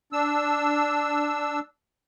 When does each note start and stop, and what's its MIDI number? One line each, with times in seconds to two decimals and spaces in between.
0.13 1.60 62
0.13 1.60 88